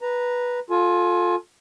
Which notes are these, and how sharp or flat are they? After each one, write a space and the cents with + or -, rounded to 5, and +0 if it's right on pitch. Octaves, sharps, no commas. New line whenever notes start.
B4 -10 A#5 +0
F4 +20 A4 +0 G#5 +25